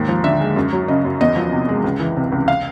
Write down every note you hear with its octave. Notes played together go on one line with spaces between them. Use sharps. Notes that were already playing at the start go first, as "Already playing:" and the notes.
Already playing: D#2 G#2
F3
D3 E5
G#3
F#2
F#3
C#3 D#5
F#2
E2 D#5
F3
C3
G#3
C#2
E3
C3
C#2
F5